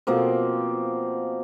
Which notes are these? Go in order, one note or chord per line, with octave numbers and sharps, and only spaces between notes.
B2 F3 A#3 C4